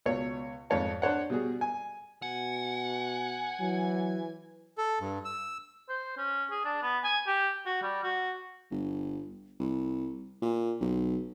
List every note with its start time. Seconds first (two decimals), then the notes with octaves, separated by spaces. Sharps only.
0.06 C#2 B2 C#5
0.70 F2 G#2 C#5 A5
1.02 D4 C5 C#5 F#5
1.30 B2 G3 F#4 G#4
1.61 G#5
2.22 B2 F#5 G#5
3.60 E3 F#3
4.78 A4
5.00 G2
5.25 E6
5.89 C5
6.17 C#4
6.51 G#4
6.65 D4
6.83 B3
7.04 G#5
7.27 G4
7.66 F#4
7.82 G3
8.04 F#4
8.71 G1
9.59 C2
10.42 A#2
10.81 B1